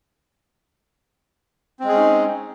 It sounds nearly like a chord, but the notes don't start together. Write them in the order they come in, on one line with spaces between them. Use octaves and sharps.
C4 G#3 G#4 C#4 D#4